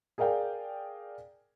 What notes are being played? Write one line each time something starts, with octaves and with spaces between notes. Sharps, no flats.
G#4 A#4 D5 F5 G5